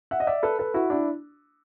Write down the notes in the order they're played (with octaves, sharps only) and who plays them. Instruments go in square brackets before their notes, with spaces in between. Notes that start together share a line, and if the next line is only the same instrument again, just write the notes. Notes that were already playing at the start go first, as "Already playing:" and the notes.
[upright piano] E5 F#5
D#5
D5 E5
A4 B4
A4 B4
E4 F#4
D4 E4